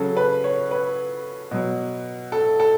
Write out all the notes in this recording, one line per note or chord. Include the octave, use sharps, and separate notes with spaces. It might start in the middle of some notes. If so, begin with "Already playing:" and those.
Already playing: C#3 F#3 A4
B4
C#5
B4
B2 F#3
A4
A4